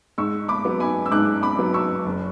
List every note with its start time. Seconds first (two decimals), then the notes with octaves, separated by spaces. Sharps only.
0.18 G#2 C#6 E6
0.48 B5 D6
0.65 F#3 B3
0.80 G#5 B5
1.06 E6
1.11 G#2 D6 F#6
1.43 B5 D6
1.59 F#3 B3
1.74 C#6 E6
2.06 F#1